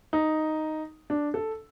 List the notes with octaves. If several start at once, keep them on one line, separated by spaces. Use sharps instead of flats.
D#4
D4
A4